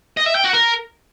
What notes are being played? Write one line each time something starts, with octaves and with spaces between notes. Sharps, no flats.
D#5
E5
G5
F#4
A#4